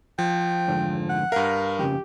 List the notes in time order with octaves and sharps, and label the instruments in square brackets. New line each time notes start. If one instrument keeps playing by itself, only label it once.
[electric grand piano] F3 [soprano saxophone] G5
[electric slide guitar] F2 G#2 D3
[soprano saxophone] F#5
[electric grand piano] G2 A#4 [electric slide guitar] F5
[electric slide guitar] F2 C#3 [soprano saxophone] G4